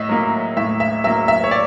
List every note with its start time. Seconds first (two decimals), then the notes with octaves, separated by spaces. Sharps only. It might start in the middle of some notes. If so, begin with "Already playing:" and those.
Already playing: A2 D#5 E5
0.09 F#3 A#3
0.57 A2 E5
0.80 E5
1.04 F#3 A#3 E5
1.28 E5
1.44 C#5
1.51 D5